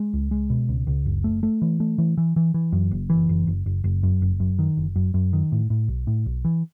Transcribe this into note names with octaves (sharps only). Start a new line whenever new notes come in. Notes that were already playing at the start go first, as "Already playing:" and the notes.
Already playing: G#3
C#2
G#3
B2
C#2
C#2
F#1
A3
A3
E3
A3
E3
E3
E3
E3
F#2
F#1
E3
F#1
F#1
F#1
F#1
F#2
F#1
F#2
D#3
F#1
F#2
F#2
D#3
A2
A2
B1
A2
B1
E3